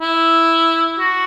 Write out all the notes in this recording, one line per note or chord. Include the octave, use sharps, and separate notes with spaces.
E4
F#4